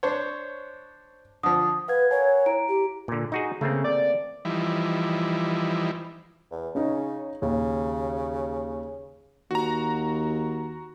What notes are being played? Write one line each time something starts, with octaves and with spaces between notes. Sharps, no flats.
D4 C5 C#5
D3 F3 D#6
B4 F5 F#5 G#6
A#4 C#5 F#5 G#5
E4 A#5 D7
G4
A#2 D3
D#4 F#4 G#4
C#3 A3 A#3 C4
D5
E3 F3 G3 D#4 E4
E2
C#3 C#4 D#4
D#2 C#3
D#2 F#4 A#5